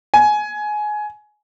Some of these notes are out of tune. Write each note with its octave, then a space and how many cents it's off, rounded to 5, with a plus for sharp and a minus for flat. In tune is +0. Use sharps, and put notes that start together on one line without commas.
G#5 +20